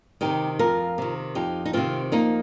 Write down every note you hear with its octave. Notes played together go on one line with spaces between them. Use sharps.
C3 D#3 D#4 G4
F2 F4 A#4
C3 D#3
F2 D#4 G4
D#4
C3 D#3 C4 F4
F2 A#3 D#4